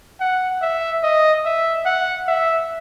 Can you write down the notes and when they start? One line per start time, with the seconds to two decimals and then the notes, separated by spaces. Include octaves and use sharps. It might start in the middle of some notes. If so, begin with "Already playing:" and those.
0.20 F#5
0.62 E5
1.03 D#5
1.45 E5
1.86 F#5
2.28 E5